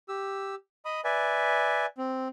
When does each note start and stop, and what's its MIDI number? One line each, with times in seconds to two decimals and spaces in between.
0.09 0.55 67
0.09 0.55 88
0.85 1.01 75
0.85 1.01 83
0.85 1.01 87
1.04 1.86 71
1.04 1.86 74
1.04 1.86 76
1.04 1.86 80
1.98 2.28 60